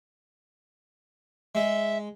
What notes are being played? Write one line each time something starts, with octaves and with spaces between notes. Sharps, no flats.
G#3 E5